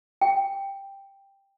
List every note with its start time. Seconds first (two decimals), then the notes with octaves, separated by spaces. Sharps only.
0.21 G5